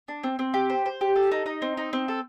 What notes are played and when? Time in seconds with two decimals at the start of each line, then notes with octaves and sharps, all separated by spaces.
0.08 D4
0.24 C4
0.39 C4
0.54 G4
0.70 C5
0.86 C5
1.01 G4
1.16 A4
1.32 D#4
1.46 D#4
1.62 C4
1.77 D#4
1.93 C4
2.08 A4